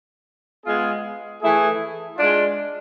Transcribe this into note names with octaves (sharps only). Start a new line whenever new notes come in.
G#3 B3 F4 G#4
E3 A3 E4 G#4
G#3 D4 F4